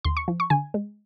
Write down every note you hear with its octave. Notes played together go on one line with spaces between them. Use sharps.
D#2 C6
C#6
F3
C#6
D3 G#5
G#3